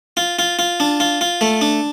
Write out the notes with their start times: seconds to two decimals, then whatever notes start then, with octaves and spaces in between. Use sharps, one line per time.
0.17 F4
0.39 F4
0.59 F4
0.80 D4
1.00 F4
1.21 F4
1.41 A3
1.61 D4